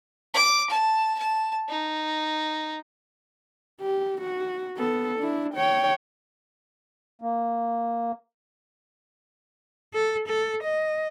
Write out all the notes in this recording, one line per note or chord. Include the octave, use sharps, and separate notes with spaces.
D6
A5
A5
D#4
G4
F#4
B3 A4
D4 E4
C#5 G5
A#3
A4
A4
D#5